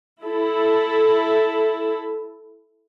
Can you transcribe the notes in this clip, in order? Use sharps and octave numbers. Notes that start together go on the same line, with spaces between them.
E4 A4